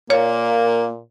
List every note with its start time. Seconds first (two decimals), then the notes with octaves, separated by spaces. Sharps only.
0.10 A#2 A#3 C#5